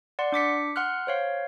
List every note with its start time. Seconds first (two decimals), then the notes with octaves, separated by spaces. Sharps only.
0.19 D5 F#5 C6
0.32 D4 D6 B6 C#7
0.76 F#5 C6 F6 F#6
1.07 C5 C#5 F5